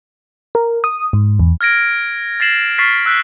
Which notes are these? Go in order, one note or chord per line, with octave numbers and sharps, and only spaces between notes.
A#4
D#6
G#2
E2
F6 G#6 A#6 D7
A6 A#6 C7 E7 F#7
C#6 F6 A6 B6 C7
E6 F#6 A#6 B6